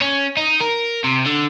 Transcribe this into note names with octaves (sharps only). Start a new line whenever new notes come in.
C#4
D#4
A#4
C3
D3